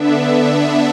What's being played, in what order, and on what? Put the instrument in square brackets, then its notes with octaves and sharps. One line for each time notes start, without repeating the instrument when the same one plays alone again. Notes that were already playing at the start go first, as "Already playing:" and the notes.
Already playing: [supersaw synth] D3 B3 D4 E5